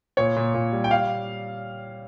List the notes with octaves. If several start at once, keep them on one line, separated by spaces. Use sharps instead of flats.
A#2 C#5
A#2
A#2
G3
G5
F5